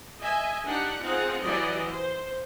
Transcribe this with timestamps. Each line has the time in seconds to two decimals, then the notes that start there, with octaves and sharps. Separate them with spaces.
0.18 D#5 E5 G#5
0.65 D4 D#4 G4 F#5
1.01 C4 D#4 F4 G#4 F#5
1.42 E3 F#3 E4 G4 D5 D#5
1.89 C5